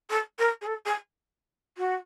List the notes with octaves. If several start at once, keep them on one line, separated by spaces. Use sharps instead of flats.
A4
A#4
G#4
A4
G#4
F#4